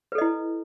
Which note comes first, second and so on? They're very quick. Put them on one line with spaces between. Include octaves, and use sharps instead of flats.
B4 A4 D#5 E4